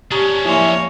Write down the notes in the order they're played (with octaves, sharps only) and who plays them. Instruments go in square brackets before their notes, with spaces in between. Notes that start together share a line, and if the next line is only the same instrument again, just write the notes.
[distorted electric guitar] C#4 D4 [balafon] G4 A#5 C#6
[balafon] F3 G#5 C6 [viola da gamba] A#3 C#5 [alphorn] E4